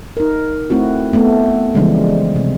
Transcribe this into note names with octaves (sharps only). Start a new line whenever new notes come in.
D#4 A#4
A3 C4 E4 F#4
A3 B3
C#3 E3 F3 G3 G#3 D4
C3